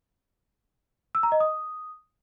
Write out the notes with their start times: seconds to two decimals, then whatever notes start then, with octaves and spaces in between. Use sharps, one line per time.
1.15 E6
1.23 A#5
1.32 D#5
1.40 D#6